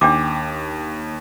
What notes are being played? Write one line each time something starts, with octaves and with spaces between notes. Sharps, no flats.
D#2 D4 G5 D6